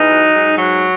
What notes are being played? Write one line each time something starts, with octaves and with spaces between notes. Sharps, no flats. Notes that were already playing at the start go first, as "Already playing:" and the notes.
Already playing: E2 D#4
F#3
G#2
F#3